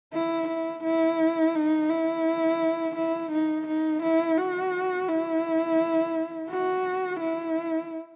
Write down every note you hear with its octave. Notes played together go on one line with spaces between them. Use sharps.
E4
E4
E4
D#4
E4
E4
D#4
D#4
E4
F#4
E4
F#4
E4